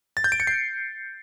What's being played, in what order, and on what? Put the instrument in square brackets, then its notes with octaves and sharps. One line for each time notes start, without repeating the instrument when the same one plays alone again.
[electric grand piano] A6
G6
D7
C#7
C7